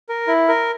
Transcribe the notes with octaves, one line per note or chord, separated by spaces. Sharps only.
A#4
E4
A#4